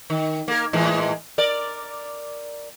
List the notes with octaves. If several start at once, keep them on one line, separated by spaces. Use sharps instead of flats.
D#3
A#3 A#4
A2 E3 G#3
A#4 D5